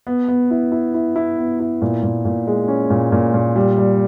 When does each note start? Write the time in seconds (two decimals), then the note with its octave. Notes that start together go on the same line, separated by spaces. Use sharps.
0.07 B3
0.28 B3
0.51 E4
0.72 E4
0.94 E4
1.16 E4
1.38 B3
1.60 E4
1.82 A#2
2.03 A#2
2.25 A#2
2.47 G#3
2.68 C#4
2.90 A#2
3.12 A#2
3.34 A#2
3.56 G3
3.78 G3